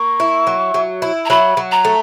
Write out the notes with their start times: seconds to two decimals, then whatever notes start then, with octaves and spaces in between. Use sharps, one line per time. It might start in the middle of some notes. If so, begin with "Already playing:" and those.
Already playing: A#3 C#6
0.20 E4
0.47 F#3
0.74 F#3
1.02 E4
1.25 A#5
1.30 F#3 B5
1.57 F#3
1.72 A#5
1.85 A3